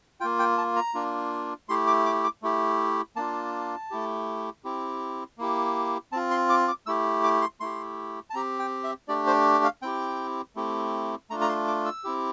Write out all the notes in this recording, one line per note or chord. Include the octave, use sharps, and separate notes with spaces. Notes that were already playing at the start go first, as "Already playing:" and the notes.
A#3 F4 G5
G5
A5
A#5
A#3 D4 F4
A3 E4 G4 C6
D6
D6
D6
A3 E4 G4
A#3 D4 F4 A5
A3 E4 G4
C4 E4 G4
A#3 E4 G4
C4 F4 A5
C6
D6
D6
A3 E4 G4 E6
D6
C6
A3 E4 G4 C6
A5
C4 G4 A#5
G5
E5
A3 D4 G4 D5
C5
F5
C4 E4 G4 G5
A3 C4 E4 G4
A3 D4 F4 A#5
A#5
C6
D6
E6
C4 E4 G4